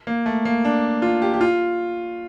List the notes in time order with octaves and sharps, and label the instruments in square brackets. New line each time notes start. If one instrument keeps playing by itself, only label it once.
[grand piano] A#3
A3
A#3
D4
F4
G4
G4
F4